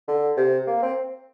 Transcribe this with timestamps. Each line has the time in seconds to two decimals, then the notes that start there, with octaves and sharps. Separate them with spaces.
0.08 D3
0.37 C3
0.67 A#3
0.82 C4